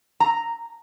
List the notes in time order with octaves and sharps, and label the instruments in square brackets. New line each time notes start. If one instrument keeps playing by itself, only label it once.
[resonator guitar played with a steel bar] A#5